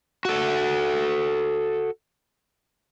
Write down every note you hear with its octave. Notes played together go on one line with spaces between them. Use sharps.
F#4 A4